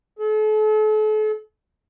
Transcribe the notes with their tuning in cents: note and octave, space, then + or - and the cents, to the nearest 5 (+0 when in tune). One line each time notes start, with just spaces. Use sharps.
A4 -40